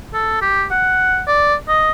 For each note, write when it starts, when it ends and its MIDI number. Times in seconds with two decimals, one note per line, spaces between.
0.14 0.40 69
0.42 0.65 67
0.71 1.22 78
1.27 1.54 74
1.68 1.92 75